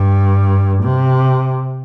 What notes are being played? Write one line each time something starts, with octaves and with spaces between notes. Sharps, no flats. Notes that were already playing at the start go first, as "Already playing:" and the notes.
Already playing: G2
C3